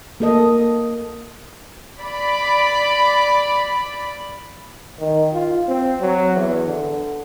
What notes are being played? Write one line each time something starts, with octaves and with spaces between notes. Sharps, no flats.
A#3 A4 D#5
D5 B5
D#3
F4
C4
F#3
E2
D3